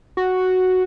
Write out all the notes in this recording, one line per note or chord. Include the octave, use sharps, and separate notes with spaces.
F#4